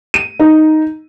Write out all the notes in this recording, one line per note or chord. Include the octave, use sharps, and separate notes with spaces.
D#7
D#4